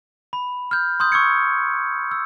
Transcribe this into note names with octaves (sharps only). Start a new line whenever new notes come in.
B5
F6 G6
C6 D#6 G6
C#6 E6 G#6 C#7
E6